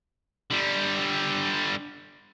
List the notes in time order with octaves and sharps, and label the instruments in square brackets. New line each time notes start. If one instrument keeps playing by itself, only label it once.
[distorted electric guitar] D3 G3